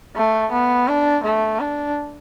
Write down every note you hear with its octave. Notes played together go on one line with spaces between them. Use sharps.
A3
B3
D4
A3
D4